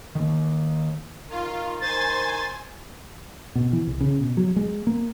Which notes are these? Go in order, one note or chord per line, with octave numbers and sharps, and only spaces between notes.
D#3 A#3
D#3 F4
D#3 C5 G#5 A6
B2
E3
C2
C#3
B2
F#3
G#3
A#3